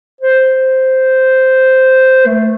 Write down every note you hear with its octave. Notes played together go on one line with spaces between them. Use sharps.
C5
A3